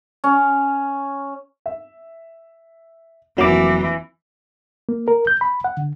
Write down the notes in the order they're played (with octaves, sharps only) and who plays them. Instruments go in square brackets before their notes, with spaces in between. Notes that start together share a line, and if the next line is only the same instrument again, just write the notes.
[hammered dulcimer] C#4
[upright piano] E5
[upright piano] F1 A#3 [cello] E3 [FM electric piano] F#3 D6
[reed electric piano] A#3
A#4
G6
B5
F#5
D3